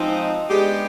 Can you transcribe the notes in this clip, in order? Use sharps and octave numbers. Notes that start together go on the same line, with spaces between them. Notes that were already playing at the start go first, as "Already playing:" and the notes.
Already playing: F3 G#3 C4 D#4
G#3 B3 D4 G4